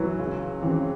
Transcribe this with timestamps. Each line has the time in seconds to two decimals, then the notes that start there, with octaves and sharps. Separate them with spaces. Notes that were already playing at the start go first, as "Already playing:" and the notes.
Already playing: E3 F#3
0.19 C#2
0.62 C#3 E3 C4